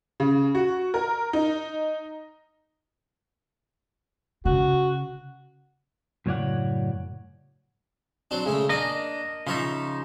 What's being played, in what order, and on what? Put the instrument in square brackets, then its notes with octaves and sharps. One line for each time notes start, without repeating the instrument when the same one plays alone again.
[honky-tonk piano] C#3
F#4
A#4
D#4
[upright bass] C#3 [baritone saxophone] F#4
[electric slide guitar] F#2 A2 C#3 C#5 D5 F#5
[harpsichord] F#3 C4 D4
C#3 G#3 A3
[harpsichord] A#3 D4 [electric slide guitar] A#4 D#5
[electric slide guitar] C#3 F3 D#4 [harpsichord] F4 C#5 E5